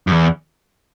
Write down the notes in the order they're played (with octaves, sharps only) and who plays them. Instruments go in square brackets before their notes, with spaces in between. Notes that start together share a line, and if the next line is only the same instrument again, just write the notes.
[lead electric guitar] F#2
E2